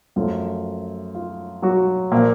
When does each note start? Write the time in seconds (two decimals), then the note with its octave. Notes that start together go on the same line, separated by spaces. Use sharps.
0.16 F#2 F3 A3 F4
1.15 F4
1.62 F#3 F#4
2.11 A#2 F3 A#3 A#4